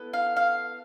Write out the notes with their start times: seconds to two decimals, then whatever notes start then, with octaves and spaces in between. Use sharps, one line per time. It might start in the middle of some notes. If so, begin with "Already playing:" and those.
Already playing: B3 E4 A4
0.13 F5
0.36 F5